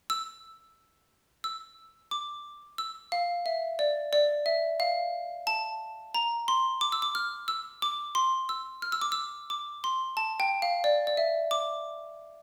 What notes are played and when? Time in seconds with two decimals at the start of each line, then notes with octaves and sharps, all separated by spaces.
0.10 E6
1.44 E6
2.11 D6
2.78 E6
3.12 F5
3.46 E5
3.79 D5
4.13 D5
4.46 E5
4.80 F5
5.47 A5
6.15 A#5
6.48 C6
6.81 D6
6.92 E6
7.02 D6
7.15 F6
7.48 E6
7.82 D6
8.15 C6
8.49 E6
8.82 F6
8.92 E6
9.01 D6
9.12 E6
9.50 D6
9.84 C6
10.17 A5
10.40 G5
10.62 F5
10.84 D5
11.07 D5
11.17 E5
11.51 D6